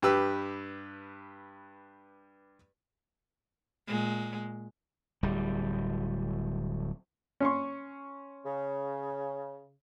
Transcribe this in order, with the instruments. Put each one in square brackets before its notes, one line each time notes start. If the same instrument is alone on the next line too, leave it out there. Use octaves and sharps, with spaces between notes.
[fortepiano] G2 G4 B4 E6
[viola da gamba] A#2 G#3
[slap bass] D1 G3
[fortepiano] C#4 C6 C#6
[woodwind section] C#3